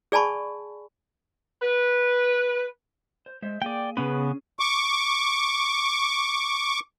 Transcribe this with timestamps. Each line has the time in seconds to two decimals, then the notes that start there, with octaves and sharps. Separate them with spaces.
0.12 G#4 D5 G#5 A5 B5 C#6
1.62 B4
3.26 C5
3.42 G#3 C5 E5
3.62 A#3 G#4 D5 G5
3.97 C#3 B3 C#4 G#4 B4
4.59 C#6 D6